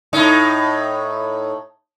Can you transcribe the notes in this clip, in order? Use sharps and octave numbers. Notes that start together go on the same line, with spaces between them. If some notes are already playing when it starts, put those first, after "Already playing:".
A2 D#4